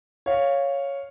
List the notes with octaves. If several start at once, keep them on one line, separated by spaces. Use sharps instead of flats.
C#5 F5